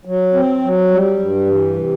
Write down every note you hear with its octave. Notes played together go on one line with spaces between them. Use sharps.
F#3
C4
F#3
G3
G2
E3
C3